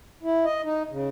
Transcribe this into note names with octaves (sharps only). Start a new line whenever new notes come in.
E4
D#5
D#4
C#3